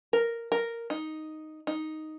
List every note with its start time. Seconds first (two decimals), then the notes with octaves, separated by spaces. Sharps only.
0.13 A#4
0.52 A#4
0.90 D#4
1.67 D#4